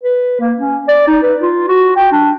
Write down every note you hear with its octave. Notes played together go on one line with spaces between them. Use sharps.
B4
A#3
C#4
D5
D#4
B4
F4
F#4
G5
D4